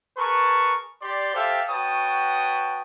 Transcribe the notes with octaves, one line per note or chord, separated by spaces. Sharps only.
G#4 A#4 B4 A5 C#6
G4 D5 C6
G4 A4 C5 E5 F5 G5
F#4 B4 C#5 G5 A5 D#6